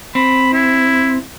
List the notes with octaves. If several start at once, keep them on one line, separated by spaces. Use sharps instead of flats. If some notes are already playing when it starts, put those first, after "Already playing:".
C4 B5
E4